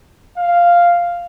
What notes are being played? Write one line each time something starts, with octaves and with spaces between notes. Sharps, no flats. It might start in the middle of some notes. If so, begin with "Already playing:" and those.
F5